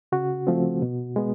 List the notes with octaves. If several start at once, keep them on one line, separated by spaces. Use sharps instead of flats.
C#3 F#4
F3 A3 C4
B2
G#3 B3